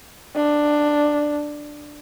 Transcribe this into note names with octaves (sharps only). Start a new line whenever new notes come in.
D4